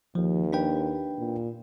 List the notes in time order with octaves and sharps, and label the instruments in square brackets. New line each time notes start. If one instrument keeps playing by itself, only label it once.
[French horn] D#2 [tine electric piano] F3
[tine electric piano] D4 B4 G5
[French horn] A#2